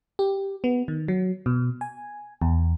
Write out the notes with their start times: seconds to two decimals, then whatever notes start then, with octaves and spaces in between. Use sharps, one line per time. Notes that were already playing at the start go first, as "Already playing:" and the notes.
0.19 G4
0.64 B3
0.88 D#3
1.08 F#3
1.46 B2
1.81 G#5
2.42 E2